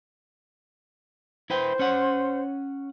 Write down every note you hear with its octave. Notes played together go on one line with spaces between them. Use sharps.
E4 B4 C5 G5
C#4 C#5 F#5